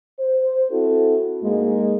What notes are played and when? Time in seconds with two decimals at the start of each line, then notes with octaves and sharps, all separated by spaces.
0.20 C5
0.71 C4 E4 F#4 A4
1.43 G#2 G#3 A#3